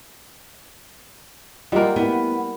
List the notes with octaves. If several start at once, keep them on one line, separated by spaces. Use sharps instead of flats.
G3 A#3 F4 D#5 F#5
B3 E4